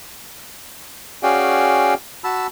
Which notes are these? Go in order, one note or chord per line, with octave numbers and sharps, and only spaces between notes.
C#4 F#4 G#4 D5 F5 G5
F#4 A5 B5 E6